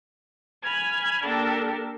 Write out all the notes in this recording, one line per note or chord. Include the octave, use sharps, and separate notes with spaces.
G#5 B5 F6 G#6
A#3 D4 G4 A4 A#4